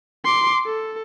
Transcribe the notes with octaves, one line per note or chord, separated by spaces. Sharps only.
C6 D6
A4